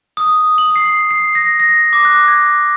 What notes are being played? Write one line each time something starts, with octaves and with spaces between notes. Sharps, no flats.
D#6
F#7
C7
C7
A#6
A#6
D6
F#6
G#6